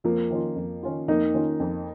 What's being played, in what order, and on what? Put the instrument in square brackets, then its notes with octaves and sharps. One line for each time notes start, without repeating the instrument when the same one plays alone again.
[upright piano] F2 [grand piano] F3 A#3
[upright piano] D#3 C#4 F4
F2
D#3 C#4 F4
[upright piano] F2 [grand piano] A#3 D#4
[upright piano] D#3 C#4 F4
F2